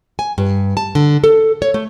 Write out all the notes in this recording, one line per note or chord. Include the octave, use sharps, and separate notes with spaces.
G#5
G2
A5
D3
A4
C#5
A3